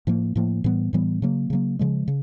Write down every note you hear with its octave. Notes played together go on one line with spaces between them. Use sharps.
A2 F3 A#3
A2 F3 A#3
A2 E3 G3 B3
A2 E3 G3 B3
C#3 F#3 A#3
C#3 F#3 A#3
C#3 F3 G#3
C#3